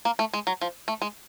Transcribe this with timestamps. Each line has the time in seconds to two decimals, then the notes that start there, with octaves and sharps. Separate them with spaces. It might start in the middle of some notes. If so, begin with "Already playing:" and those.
0.05 A#3
0.19 A3
0.33 G#3
0.47 F#3
0.61 F3
0.88 A3
1.02 G#3